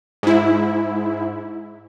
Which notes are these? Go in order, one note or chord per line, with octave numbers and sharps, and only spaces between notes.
G#2 E4